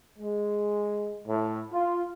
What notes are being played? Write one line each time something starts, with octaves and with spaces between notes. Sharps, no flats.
G#3
A2
F4